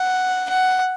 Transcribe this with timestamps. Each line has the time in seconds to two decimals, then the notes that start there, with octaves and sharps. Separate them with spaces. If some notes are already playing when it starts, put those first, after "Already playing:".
Already playing: F#5
0.50 F#5